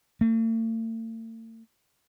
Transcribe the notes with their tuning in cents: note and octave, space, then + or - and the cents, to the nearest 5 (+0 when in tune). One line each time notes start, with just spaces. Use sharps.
A3 +45